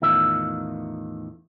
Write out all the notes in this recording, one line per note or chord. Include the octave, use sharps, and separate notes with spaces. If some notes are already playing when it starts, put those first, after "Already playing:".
E2 A2 D#3 F4 E5